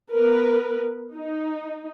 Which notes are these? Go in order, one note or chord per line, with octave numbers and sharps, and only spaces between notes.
B3 A#4 B4
D#4